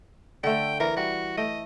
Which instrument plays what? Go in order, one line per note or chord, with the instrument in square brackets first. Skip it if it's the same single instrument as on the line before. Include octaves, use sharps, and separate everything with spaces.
[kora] D3 A3 [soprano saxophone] G5
[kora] E3 [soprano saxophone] A#4
[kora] G3 [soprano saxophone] F#4
[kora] A3 G5 [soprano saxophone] D#5